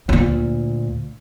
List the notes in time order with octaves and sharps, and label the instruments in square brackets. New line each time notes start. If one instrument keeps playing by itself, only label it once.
[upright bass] D2 A#2